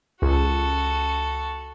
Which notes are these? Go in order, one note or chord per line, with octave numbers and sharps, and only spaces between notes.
C#2 F#4 A4